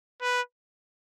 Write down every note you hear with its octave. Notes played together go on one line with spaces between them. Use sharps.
B4